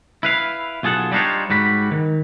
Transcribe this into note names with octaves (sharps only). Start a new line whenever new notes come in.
E4 B4 F5
B1 F4 G#4 A4 F#5
G3 D4 D#4 F4 C5 C#5
G#2 G3 F#4 B5
D#3